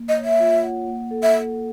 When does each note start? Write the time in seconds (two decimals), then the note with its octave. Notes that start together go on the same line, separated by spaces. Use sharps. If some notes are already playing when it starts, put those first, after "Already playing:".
Already playing: A#3
0.08 D#5
0.17 C#5
0.24 E5
0.40 F4
0.63 F#5
0.88 A#3
1.11 A4
1.23 E5